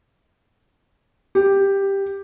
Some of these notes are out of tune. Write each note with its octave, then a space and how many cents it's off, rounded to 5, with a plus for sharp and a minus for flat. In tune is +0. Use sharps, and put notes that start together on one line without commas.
G4 +5